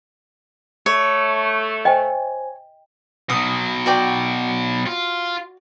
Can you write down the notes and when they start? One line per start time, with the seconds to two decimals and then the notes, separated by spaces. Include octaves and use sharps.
0.86 A3 C#5 C#7
1.85 C5 D#5 G5 G#5
3.30 B2 F#3 D#6
3.86 F#4 D5 G5
4.87 F4